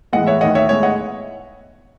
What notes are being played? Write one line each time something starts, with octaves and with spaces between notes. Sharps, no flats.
A2 E3 G#3 B3 D#5 F#5
C#5 E5
D#2 D#3 A3 D#5 F#5
C#5 E5
A2 G#3 B3 C#5 E5
D#5 F#5